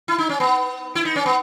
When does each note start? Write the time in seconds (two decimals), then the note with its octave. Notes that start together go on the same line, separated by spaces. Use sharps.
0.08 E4
0.18 D#4
0.29 C#4
0.40 B3
0.95 E4
1.05 D#4
1.16 C#4
1.26 B3